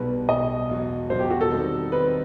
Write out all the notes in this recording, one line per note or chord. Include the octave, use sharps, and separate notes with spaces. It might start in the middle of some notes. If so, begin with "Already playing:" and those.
Already playing: B1 B2 G3 B4
B1 B2 G3 D#5
E1 E2 B2 F#3
E1 E2 B2 F#3 C5
G4
F#4
A4
D#3 G3 C4 D#4
D#3 G3 C4 D#4 B4